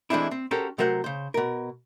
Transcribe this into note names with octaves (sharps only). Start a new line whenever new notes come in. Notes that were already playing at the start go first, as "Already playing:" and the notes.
E3 G#3 A3 C4 D4 E4
C4
C#4 F#4 G4 A4 A#4 C5
C3 F#3 A3 A#4 C5 F#5
C#3 C5
B2 A#4